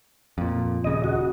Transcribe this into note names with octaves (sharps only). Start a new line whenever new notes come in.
F2 A#2
D#1 C#3 D#5
F#4